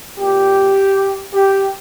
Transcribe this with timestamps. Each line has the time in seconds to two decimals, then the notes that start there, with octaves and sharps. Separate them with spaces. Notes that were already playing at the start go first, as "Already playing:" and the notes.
0.18 A#2 G4
1.33 G4